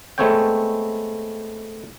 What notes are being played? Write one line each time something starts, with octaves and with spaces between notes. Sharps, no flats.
G#3 A3 B3 C4 C#5 G5